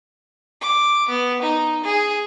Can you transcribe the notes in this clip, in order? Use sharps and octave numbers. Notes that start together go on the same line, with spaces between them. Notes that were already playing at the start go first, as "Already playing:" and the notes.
D6
B3
D#4
G#4